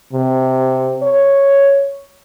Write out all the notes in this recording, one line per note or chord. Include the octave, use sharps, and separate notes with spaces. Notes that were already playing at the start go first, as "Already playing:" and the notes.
C3
C#5